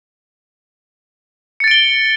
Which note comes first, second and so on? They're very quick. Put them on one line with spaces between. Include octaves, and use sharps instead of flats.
C#7 A6 D7 G7